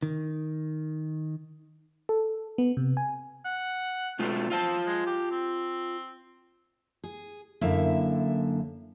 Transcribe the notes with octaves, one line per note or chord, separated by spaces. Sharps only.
D#3
A4
B3
C3
G#5
F#5
B2 G#3 A3 F4
C4 F4 F5 A5
G#3
G4
C4
G#4
F#2 D3 A#3 E4 A4 E5